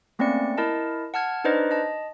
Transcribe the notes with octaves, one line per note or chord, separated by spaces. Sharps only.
A3 A#3 C4 C#4 D5 C#7
E4 A#4 D#5 A5
F#5 A5 F6 G#6
D4 D#4 B4 C5 D5 D#5
D#5 A5